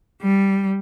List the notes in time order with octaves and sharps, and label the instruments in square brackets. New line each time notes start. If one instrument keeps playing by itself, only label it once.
[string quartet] G3